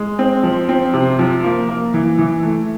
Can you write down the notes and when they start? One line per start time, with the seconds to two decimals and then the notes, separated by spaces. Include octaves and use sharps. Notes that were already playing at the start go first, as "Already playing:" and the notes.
Already playing: G#3
0.19 C4
0.43 F3
0.69 C4
0.93 C3
1.19 F3
1.43 A#3
1.68 A#3
1.94 E3
2.19 E3
2.43 A3